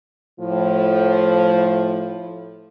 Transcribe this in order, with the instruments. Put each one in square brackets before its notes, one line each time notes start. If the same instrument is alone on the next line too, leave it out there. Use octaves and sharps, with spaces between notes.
[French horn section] A2 F3